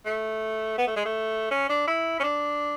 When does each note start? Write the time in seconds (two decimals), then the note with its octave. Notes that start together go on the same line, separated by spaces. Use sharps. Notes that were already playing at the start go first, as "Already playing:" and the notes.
0.05 A3
0.78 B3
0.87 A3
0.96 G#3
1.06 A3
1.51 C#4
1.69 D4
1.87 E4
2.20 C#4
2.24 D4